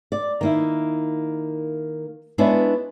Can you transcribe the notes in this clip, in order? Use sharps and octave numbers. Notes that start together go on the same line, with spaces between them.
D5
D#3 A#3 E4
G#3 B3 D4 E4 B4 C#5